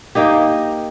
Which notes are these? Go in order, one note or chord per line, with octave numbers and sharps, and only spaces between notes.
A#3 D#4 G4